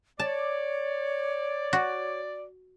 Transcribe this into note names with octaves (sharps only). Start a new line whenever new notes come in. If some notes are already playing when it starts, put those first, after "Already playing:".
C#5 D5 A5
F#4